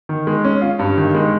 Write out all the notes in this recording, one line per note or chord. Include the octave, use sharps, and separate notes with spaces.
D#3
G#3
C#4
F4
G2
D#3
G#3